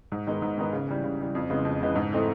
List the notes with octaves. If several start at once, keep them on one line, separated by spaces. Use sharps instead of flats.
G#2
D#3 G#3 B3 D#4
G#2
D#3 G#3 B3 D#4
C#3
E3 G3
C#3
E3 G3
F2
C#3 E3 G#3 B3
F2
C#3 E3 G#3 B3
G#2
E3 A3 C4 D#4